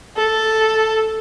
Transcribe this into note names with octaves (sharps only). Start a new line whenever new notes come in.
A4